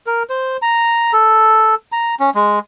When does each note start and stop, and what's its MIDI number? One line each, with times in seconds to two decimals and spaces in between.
0.07 0.23 70
0.30 0.57 72
0.62 1.12 82
1.13 1.75 69
1.92 2.15 82
2.20 2.30 61
2.35 2.59 56